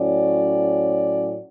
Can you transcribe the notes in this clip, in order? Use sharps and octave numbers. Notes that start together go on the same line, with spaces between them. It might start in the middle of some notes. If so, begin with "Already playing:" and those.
Already playing: A2 F#3 C#4 D5